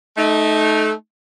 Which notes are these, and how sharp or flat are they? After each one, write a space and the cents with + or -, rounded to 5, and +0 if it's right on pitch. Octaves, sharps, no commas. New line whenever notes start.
A3 -20 D#4 +0